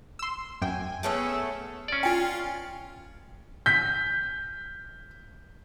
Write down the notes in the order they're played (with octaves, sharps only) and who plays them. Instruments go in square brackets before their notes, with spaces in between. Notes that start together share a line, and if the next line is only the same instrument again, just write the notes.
[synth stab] C6 E6
[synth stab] F#2 G5 [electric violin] G#5
[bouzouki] A3 B3 C#4 [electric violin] G#4 E6
[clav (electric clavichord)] C#4 D5
[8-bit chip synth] F4 F5 [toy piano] G5 G#5
[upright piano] G6 B6